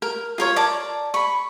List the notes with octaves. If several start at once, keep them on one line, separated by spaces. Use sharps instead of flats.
A#4
F4 A#4 C#5
D5 A5 A#5
B5 C#6